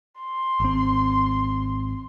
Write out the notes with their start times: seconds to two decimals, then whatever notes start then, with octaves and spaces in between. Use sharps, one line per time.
0.21 C6
0.60 G#1 C4